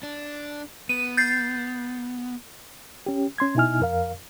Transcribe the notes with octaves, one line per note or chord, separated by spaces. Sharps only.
D4
B3 D#7
G6 A6 C7
C#4 G4
C#4 C6 G#6
B2 D#4 E4 G#5 F6
F2 A#4 F5